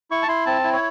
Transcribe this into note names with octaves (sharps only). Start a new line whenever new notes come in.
E4 C#6
A5
E4 C6
C4 A5
E4
C#5